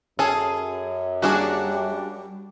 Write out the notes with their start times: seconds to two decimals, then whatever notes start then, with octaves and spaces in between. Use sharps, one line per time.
0.19 F#2 C#4 G#4 A4
1.22 G3 A#3 C#4 D4 F#4 G#4